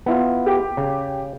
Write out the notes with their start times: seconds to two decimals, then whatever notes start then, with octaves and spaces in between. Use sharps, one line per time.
0.06 B3 E4 F4
0.46 G4
0.77 C#3